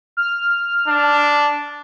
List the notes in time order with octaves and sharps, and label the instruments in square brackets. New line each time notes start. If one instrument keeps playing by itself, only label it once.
[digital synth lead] F6
[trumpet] D4